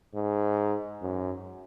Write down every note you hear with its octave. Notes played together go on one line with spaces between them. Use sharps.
G#2
F#2